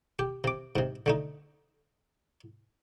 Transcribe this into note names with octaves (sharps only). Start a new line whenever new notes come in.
G4
C3 D6
G#2 C3
D3 A3 D#4